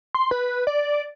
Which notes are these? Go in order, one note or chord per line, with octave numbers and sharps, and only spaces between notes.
C6
B4
D5